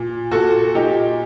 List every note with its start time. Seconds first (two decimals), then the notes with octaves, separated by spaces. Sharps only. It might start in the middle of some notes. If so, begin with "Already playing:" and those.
Already playing: A#2
0.31 A#2 F#4 A4
0.75 A#2 D#4 G4